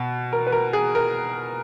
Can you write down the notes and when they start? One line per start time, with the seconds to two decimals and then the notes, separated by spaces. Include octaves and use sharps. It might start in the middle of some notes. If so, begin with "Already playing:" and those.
Already playing: B2
0.33 A#4
0.47 B4
0.52 A#4
0.73 G#4
0.95 A#4